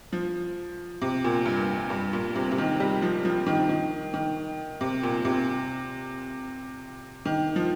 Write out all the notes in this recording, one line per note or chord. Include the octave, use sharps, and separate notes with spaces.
F3
C3
A#2
G2
G2
A#2
C3
C3
D#3
G3
F3
F3
D#3
D#3
D#3
C3
A#2
C3
D#3
F3